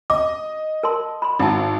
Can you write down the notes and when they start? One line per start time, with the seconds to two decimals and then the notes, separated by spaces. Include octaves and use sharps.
0.10 D#5 D6
0.83 A#4 A5 C6
1.22 B5 C6
1.39 G#1 E4 F#5 A5